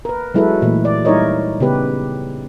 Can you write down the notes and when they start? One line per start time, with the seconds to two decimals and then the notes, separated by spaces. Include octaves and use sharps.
0.05 A#4 B4
0.34 F#3 G#3 E4 F#4 A4 B4
0.62 A#2 E3 A3
0.85 D5
1.05 G3 D#4 E4 A#4 C#5 D#5
1.60 C#3 B3 G4 B4